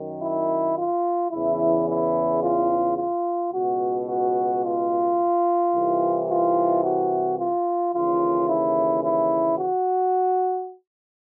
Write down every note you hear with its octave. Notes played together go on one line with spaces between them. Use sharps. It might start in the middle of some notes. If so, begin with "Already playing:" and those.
Already playing: F#2 D#3
E4
F4
E2 C#3 E3 E4
E4
F4
F4
C#2 B2 F#4
F#4
F4
C2 C3 E3
F4
F#4
F4
D#2 C#3 E3 F4
E4
E4
F#4